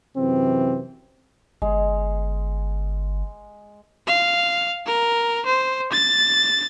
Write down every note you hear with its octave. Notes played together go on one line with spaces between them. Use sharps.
F#2 C3 E3 C4
G1 G#3
F5
A#4
C5
A6